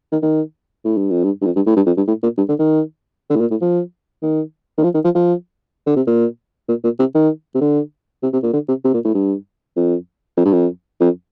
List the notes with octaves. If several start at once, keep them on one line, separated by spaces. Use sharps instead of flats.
D#3
D#3
A2
G2
F2
G2
G2
F2
G2
A2
G2
F2
G2
A2
A#2
G2
D3
D#3
D3
A2
A#2
A2
F3
D#3
D#3
F3
D#3
F3
F3
D3
C3
A#2
A#2
A#2
C3
D#3
C3
D3
C3
C3
A#2
D3
C3
C3
A#2
A2
G2
F2
F2
G2
F2
F2